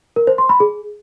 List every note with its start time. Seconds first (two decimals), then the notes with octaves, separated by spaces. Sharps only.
0.16 A#4
0.27 C5
0.38 C6
0.49 B5
0.60 G#4